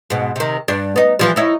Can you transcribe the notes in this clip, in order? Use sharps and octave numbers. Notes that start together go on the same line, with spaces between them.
G#2 B2
C3 D#3
G2 D4
B3 D#4
E3 F3 G3
D#4 E4 C#5